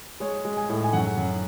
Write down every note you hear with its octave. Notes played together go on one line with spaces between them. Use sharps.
G#3 C#5
G#3
G#5
A2
G#5
F#2 F#5
F#2